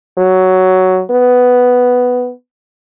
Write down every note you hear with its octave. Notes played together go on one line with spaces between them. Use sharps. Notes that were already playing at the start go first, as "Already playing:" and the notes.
F#3
B3